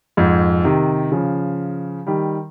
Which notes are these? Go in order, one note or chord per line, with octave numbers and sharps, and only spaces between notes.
F2 G#2
C3 D#3
C#3 F3
D#3 G3